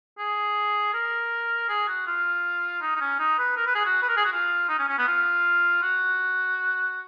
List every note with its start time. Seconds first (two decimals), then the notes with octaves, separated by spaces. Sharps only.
0.19 G#4
0.94 A#4
1.69 G#4
1.88 F#4
2.07 F4
2.82 D#4
2.96 D#4
3.01 C#4
3.20 D#4
3.39 B4
3.57 A#4
3.66 B4
3.75 G#4
3.85 F#4
4.02 B4
4.09 A#4
4.17 G#4
4.25 F#4
4.32 F4
4.69 D#4
4.79 C#4
4.89 C#4
4.99 B3
5.08 F4
5.83 F#4